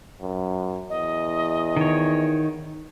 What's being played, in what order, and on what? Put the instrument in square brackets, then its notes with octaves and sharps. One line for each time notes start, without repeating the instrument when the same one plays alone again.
[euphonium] F#2
[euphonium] E2 [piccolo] D#5
[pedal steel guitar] D#3 C#5